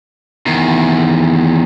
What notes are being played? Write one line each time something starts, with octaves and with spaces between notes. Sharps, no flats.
E2 D#3